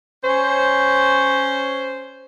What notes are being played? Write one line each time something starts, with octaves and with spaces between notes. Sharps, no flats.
C#4 C5